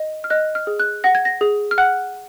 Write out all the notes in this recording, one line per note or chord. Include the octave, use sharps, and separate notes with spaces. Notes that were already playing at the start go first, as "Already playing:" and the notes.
Already playing: D#5
F6
D#5 F#6
F6
G#4
F#6
F#5 A#6
G#6
A#6
G#4
F6
F#5 F#6